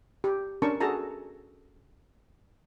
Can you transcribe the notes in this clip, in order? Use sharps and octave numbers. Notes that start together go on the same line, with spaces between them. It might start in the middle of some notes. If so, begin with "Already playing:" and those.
G4
C#4 D4 A#4 A5 C#6
F#4 G#4 A4 A5 A#5